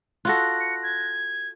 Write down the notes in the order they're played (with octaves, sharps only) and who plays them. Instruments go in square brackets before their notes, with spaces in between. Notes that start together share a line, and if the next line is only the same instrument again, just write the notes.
[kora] F4 F#4 A4 [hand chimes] F#6 A#6
[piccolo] C#7
G#6